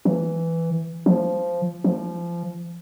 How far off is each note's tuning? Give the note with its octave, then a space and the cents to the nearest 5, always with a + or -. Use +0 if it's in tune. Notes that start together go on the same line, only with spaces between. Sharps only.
E3 +5
F3 -10
F3 -25